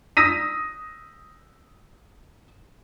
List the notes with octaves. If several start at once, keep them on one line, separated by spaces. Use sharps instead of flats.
D#6 E6 A#6 B6 D#7